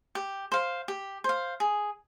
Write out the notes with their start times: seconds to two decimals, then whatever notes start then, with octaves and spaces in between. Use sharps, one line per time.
0.15 G4
0.52 C5 F5
0.88 G4
1.24 C5 F5
1.60 G#4